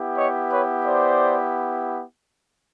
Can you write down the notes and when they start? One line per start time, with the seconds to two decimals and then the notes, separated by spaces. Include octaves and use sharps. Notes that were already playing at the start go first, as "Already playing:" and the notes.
Already playing: B3 E4 G4
0.16 C#5 D#5
0.51 B4 C#5
0.86 C5 D5